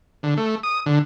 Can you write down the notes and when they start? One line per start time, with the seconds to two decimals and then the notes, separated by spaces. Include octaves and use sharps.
0.23 D3
0.37 A3
0.63 D#6
0.86 D3